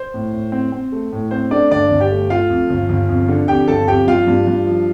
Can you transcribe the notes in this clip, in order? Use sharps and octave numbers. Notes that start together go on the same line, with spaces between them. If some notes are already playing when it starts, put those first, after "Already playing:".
Already playing: C5
A2
A2
C4
C4
A3
A2
C4 C5
A3 D4 D5
G1 D4 D5
G1
G4 G5
A3
A3 F4 F5
F2
G1
G1
F2
D3
F2 G4 G5
G1 A4 A5
F2 G4 G5
G2 F4 F5
G2
G2
F3